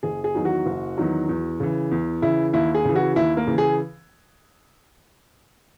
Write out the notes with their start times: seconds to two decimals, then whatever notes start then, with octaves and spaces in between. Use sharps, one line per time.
0.03 F#1 G#4
0.24 G#4
0.35 E2 D#3 F#3
0.45 F#4
0.66 F#1
0.97 E2 D#3 F#3
1.29 E2
1.60 C#3 E3
1.91 E2
2.22 C#3 E3 E4
2.53 D#2 E4
2.75 G#4
2.85 C#3 E3
2.95 F#4
3.16 D#2 E4
3.37 A#3
3.47 C#3 E3
3.58 G#4